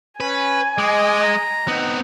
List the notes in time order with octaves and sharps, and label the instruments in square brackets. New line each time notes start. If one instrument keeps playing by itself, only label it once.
[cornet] C#4 [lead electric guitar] B4 [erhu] G#5
[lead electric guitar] G#3 [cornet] D#5 [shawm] D6
[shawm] A#5
[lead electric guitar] B3 C4 [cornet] D#4